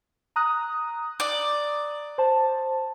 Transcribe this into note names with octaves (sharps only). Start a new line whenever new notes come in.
A#5 D#6 F#6
D5
C5 A5